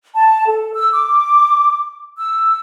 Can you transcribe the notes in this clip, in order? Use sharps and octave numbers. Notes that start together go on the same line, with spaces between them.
A5
A4
E6
D6
E6